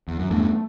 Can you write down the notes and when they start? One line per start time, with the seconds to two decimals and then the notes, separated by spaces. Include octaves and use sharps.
0.08 E2
0.19 F#2
0.30 E2 G2 A3